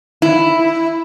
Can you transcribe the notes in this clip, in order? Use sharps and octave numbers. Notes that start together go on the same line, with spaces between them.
E4